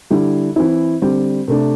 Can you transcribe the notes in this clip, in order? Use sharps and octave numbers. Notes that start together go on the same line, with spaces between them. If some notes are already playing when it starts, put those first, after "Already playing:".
D3 G3 E4
E3 C4 E4
D3 G3 C4
C3 A3 D4